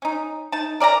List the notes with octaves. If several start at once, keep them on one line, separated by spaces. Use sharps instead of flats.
C#4 D#4
D#4 A5
A#4 D5 G#5 A#5